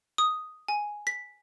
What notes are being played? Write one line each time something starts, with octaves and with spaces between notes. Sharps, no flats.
D#6
G#5
B6